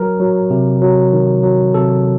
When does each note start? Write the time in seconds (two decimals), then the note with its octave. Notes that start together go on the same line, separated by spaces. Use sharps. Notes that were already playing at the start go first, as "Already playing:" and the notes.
Already playing: F#3 A#4
0.20 F#3
0.50 C3
0.82 F#3
1.13 D#3
1.43 F#3
1.74 C3 A4